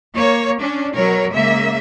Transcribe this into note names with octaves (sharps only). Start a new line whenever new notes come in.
A#3 C#5
C#4 D4
B2 F#3 A#4 C#5
C#3 G#3 A#3 E5